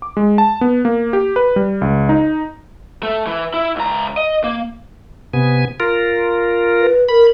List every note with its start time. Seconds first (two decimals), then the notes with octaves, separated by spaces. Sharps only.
0.02 D6
0.17 G#3
0.38 A5
0.61 B3
0.85 A#3
1.13 G4
1.36 B4
1.56 G3
1.81 C#2
2.09 D#4
3.03 A3
3.27 E3
3.54 E4
3.76 C#2 A#5
4.17 D#5
4.44 A#3
5.33 C3 B3 G#5
5.80 F4 A#4
6.80 B4
7.09 A#4 B5